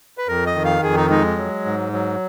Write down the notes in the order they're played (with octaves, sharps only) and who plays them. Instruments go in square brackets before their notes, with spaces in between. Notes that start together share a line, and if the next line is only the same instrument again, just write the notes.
[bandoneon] B4
F2 A#4
D#5
D#3
F5
F2 G#4
D#4
G#3 D#4
F#3
G#2
F#3